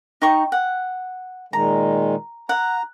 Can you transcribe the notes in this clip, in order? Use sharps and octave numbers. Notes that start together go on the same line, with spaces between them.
D#4 G5 C#6
F#5
A#2 D#3 G#3 A#5
F#5 A#5